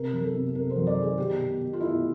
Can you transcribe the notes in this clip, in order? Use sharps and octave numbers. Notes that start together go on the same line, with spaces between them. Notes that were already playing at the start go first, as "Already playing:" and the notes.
Already playing: C3 A#4
F#3
A4
C3
C3 A#4
C5
F#3
D5
D#3 G#4
B2 G4
B2
B2
F4
B2 E4